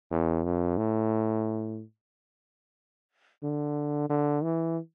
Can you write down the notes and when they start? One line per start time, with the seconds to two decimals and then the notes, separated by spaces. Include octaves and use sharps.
0.11 E2
0.44 F2
0.78 A2
3.43 D3
4.10 D3
4.43 E3